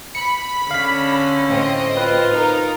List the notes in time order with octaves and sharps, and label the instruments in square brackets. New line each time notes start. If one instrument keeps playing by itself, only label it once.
[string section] B5 [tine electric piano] C#7
[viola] D3 C#4 [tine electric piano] F5 B6
[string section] A2 C4 D#5
[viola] F4 [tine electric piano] B4
[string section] D#4 A#4